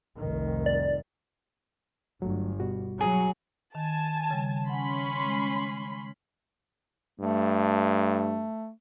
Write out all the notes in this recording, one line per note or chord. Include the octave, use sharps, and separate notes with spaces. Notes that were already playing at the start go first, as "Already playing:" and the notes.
F1 C2 D#3
D5
G1 F#3 A3
B2 G3 F#4
F#3 G#4
D#3 G#5 A5
C#3 G3
C#4 F#5 G#5 B5 C6
G#3
G2 A3